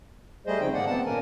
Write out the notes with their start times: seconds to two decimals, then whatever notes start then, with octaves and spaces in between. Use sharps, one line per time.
0.47 G3 A3 G#4 C5 D#5
0.61 C#3 F3 C4 D#4 G5
0.74 G#2 D#3 A#3 D5 F#5
0.86 B3 C4 F#5 A5
1.05 A#2 A#3 C#4 A#4 G#5